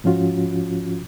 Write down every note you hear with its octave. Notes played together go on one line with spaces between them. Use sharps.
G#2 F3 C#4 F4 F#4